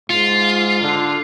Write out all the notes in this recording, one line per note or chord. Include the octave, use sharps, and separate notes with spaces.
G#2 F4
D3